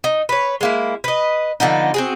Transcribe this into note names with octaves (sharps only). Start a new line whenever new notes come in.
D#4
B4 C#5
G#3 A#3 E4
B4 D#5
D3 F3 B3 D#4
C4 F#4 G#4